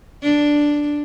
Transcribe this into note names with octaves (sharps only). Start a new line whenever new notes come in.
D4